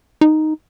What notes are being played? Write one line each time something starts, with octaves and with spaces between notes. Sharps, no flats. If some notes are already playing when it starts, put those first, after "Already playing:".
D#4